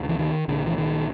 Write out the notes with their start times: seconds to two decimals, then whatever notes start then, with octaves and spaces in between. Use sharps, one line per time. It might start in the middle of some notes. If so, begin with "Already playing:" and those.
Already playing: D2 C3
0.09 E3
0.19 D#3
0.48 C2 A#2 D3
0.67 E3
0.78 D#3